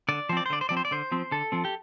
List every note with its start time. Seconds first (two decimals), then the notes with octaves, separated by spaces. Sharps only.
0.09 D3 D5
0.29 F3 C5
0.33 C4 D5
0.46 C5
0.50 D3 D5
0.61 C5
0.69 F3 C4 D5
0.77 C5
0.85 D5
0.91 D3 C5
1.12 F3 C4
1.31 D3 A4
1.52 F3 C4
1.65 G4